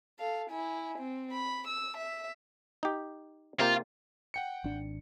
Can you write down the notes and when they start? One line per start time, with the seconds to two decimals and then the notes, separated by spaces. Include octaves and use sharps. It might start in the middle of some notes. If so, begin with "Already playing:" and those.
0.20 A4 F5
0.50 E4 G#5
0.98 C4
1.32 B5
1.68 E6
1.97 E5
2.83 D#4 G4
3.60 C3 A#3 F4 G5
4.34 F#5 G5 C#7
4.64 G#1 D4